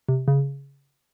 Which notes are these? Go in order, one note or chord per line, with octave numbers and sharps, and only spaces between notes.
C3
C#3